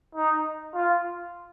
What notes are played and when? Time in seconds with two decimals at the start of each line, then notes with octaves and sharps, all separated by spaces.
0.15 D#4
0.75 F4